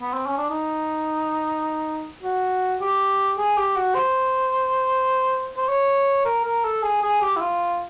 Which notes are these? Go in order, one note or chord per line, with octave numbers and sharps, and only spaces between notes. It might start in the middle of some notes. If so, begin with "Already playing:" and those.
B3
C4
C#4
D4
D#4
F#4
G4
G#4
G4
F#4
C5
C5
C#5
A#4
A#4
A4
G#4
G#4
G4
E4
F4